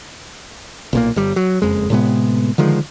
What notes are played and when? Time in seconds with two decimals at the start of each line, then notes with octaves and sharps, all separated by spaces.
0.93 B1 A#2 A#3
1.16 G1 G3
1.36 F#3
1.62 F#1 F2 G#3
1.90 A2 C3 G#3 B3
2.58 D3 D#3 F3 G#3